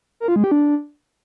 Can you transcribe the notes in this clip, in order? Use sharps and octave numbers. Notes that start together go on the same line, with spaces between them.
A#4
F4
G#3
G4
D4